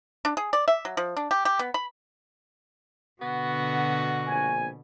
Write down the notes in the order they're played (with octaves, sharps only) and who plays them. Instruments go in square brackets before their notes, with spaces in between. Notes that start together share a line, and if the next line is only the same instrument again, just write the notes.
[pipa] D4
G#4
D5
E5
F#3
F3
D4
G4
G4
B3
B5
[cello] B2 D3 [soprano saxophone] B3 [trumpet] F#4
[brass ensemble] A#1 C4 G#5